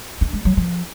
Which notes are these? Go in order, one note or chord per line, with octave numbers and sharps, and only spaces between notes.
D4
G#3
F#3
F3